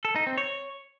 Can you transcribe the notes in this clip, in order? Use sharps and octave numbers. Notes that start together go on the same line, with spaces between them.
A4
D#4
C4
C#5